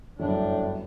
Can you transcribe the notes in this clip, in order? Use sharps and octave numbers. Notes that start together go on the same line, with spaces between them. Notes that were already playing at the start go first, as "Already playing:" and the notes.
G1 F#2 A2 D4